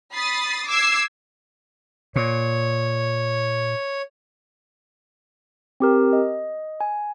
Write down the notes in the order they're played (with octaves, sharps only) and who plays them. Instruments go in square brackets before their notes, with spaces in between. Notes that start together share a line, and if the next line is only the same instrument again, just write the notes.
[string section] B5 D#6 A6 C7
D6 E6 G#6 C7
[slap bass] A#2 [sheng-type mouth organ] C#5
[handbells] C4 G4 A#4
D#5
G#5